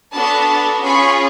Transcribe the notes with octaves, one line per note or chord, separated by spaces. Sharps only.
B3 D4 F#4 A4 A5 B5
C#4 F4 G#4 B5 C#6